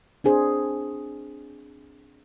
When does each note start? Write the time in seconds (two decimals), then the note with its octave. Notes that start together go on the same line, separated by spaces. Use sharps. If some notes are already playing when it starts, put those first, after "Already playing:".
0.24 C4 D4 G#4 C5